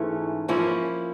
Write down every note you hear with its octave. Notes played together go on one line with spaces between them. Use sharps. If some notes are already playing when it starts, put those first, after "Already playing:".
Already playing: G#2 E3 A3 C#4
F3 A#3 C#4 E4